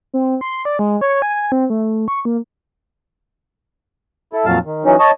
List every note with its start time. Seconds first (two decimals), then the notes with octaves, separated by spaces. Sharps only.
0.14 C4
0.41 C6
0.65 D5
0.79 G#3
1.01 C#5
1.22 G#5
1.52 C4
1.70 A3
2.08 C#6
2.25 A#3
4.33 E4 A4
4.46 F2 A#2 F#3 F5 A5
4.66 D#3
4.85 E3 F#3 C#4 D#4
4.99 C#5 D#5 A5